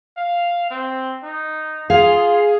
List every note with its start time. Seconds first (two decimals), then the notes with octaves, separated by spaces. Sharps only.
0.17 F5
0.71 C4
1.23 D#4
1.90 F4 G#4 F5